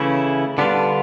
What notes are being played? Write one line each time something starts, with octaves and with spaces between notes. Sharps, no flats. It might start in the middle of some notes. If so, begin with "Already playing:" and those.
Already playing: C#3 E3 A3 C#4 E4
D3 G3 B3 D4 F4